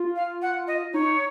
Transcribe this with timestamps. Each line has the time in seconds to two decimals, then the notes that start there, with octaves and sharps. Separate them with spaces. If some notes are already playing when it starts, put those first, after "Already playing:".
Already playing: F4
0.16 F5
0.42 F#5
0.67 D#5
0.93 D#4 C#5